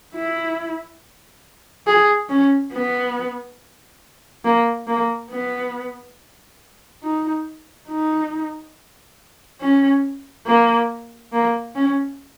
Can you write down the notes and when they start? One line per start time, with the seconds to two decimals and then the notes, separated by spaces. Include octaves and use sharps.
0.15 E4
1.87 G#4
2.29 C#4
2.73 B3
4.45 A#3
4.87 A#3
5.31 B3
7.03 D#4
7.89 D#4
9.61 C#4
10.46 A#3
11.32 A#3
11.75 C#4